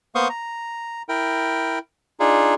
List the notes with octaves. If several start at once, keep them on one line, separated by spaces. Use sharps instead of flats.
A#3 B3 C5 F5 C#6 D#6
A#5
E4 A#4 G5
D4 D#4 F4 G#4